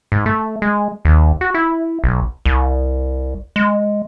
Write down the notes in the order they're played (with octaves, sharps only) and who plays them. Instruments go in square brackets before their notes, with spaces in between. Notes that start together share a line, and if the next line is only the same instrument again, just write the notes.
[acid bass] G#2
A3
G#3
D#2
F#4
E4
B1
C2
G#3